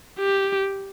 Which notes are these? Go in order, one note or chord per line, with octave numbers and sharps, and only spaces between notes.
G4